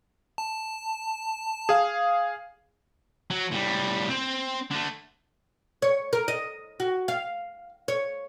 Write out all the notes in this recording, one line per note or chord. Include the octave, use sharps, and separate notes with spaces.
A5
G#4 F5
F#3
A2 G3
C4
D3 A3
C#5
A#4
D#5
F#4
F5
C#5